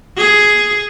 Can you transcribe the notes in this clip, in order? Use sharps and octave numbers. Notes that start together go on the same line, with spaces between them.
G#4